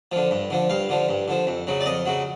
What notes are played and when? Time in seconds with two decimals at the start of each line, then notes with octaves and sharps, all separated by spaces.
0.12 D3 F3
0.31 G2
0.50 D3 F3
0.70 G2 F5
0.89 D3 F3
1.09 G2
1.28 D3 F3
1.47 F2
1.67 C#3 F#3
1.81 D5
1.86 F2 D#5
2.06 C#3 F#3